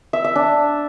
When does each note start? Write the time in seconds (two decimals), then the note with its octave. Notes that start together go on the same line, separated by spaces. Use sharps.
0.13 E5
0.24 E5
0.35 D4